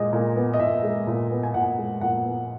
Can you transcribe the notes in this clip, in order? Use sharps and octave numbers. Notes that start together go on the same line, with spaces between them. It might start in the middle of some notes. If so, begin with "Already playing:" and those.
Already playing: A#2 G#3 D#5
A#2
B3
D#5
A#2 E5
G#3
A#2
B3
G#5
A#2 F#5
G#3
A#2 F#5
B3